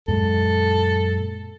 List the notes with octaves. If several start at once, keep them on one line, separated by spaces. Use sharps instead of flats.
F#2 A#2 G#3 A4